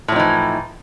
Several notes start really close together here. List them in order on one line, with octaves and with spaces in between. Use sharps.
A2 F3 D#4 E3